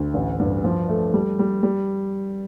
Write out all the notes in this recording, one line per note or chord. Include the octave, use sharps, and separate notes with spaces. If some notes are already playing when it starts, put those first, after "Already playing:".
Already playing: D2
A1
G2
F3
A3
G3
G3
G3